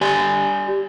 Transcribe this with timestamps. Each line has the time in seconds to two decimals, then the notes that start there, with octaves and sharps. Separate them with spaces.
0.01 G4 D5 G#5